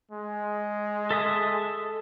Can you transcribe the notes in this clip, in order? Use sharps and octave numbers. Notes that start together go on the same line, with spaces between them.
G#3
A4 E5 D#6